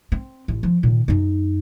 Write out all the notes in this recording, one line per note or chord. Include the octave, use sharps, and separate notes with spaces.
C4
A1
F3
A#2 D#3
F#2 D#4